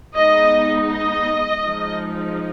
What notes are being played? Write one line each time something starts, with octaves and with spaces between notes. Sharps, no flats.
G#3 B3 D#4 D#5
D#5
F3 G#3 D#4